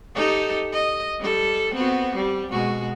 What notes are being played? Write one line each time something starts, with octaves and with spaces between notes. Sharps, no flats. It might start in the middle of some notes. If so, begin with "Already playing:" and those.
D#4 G4 A4
D#5
G3 A4
B3 C4 F#4
G3
B2 G#3 F#4